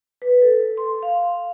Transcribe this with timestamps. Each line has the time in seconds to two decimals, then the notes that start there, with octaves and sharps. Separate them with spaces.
0.22 B4
0.42 A4
0.77 C6
1.03 F5